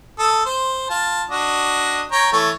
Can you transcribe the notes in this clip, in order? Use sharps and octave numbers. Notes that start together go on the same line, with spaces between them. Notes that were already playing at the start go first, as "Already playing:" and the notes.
A4 D#6
C5
F4 A5
D4 F#4 D#5
C#5 G5 A#5
E3 A3 C#5